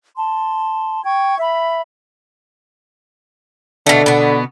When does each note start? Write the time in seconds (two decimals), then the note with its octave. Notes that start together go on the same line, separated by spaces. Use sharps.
0.17 A5 C6
1.05 G5 C#6 G#6
1.40 E5 B5
3.87 B2 D3 A3
4.06 B2 B3